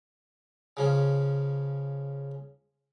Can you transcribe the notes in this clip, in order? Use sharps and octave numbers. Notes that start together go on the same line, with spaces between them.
C#3 F3 C#4